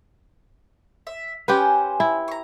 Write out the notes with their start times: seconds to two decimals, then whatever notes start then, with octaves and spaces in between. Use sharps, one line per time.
1.07 E5
1.48 C#4 G4 B4 C5 G#5
2.00 E4
2.28 A#5 C#6